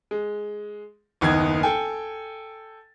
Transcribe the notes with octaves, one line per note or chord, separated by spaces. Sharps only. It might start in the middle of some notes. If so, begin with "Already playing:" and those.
G#3
F#1 D#2 B3 D#4 G#6
A4 G5 G#5